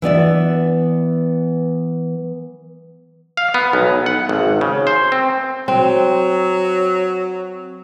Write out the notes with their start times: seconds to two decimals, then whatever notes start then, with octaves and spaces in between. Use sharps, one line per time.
0.02 E3 B3 D5 E5
3.37 F5
3.54 B3
3.73 B1
4.06 F#5
4.29 G#1
4.61 C#3
4.87 C5
5.12 C4
5.68 F#3 C4